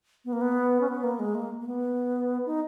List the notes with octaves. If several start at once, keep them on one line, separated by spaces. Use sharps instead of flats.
B3
A#3
B3
C#4
B3
A#3
G#3
A#3
A#3
B3
D#4